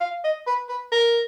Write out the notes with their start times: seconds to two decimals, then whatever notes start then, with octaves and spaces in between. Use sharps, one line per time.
0.01 F5
0.24 D#5
0.47 B4
0.69 B4
0.92 A#4